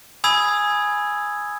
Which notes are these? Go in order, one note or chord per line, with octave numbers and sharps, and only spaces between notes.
G#5 B5 D#6 E6 G#6